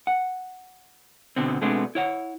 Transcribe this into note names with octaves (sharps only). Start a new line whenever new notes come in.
F#5
B2 D3 B3 C4
B2 G#3 A3 B3 C4 D4
E4 C#5 F#5